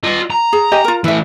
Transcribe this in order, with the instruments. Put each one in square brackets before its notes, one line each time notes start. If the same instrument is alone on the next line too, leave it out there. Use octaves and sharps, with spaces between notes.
[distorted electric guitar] F4 D#5
A#5
[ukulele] G#4
G4 D#5 G#5
F4 A#4
[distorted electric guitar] E3 A3 [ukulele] E4 E5